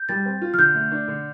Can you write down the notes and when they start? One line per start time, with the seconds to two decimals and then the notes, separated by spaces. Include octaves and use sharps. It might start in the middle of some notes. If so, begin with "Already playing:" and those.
Already playing: G6
0.09 G3 A6
0.26 C4
0.42 F4
0.54 F6
0.58 D3 G6
0.75 A3
0.92 D4
1.08 D3